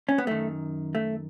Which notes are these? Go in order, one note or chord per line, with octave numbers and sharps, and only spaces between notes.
C#4
B3
F#2 D#3 A3
A3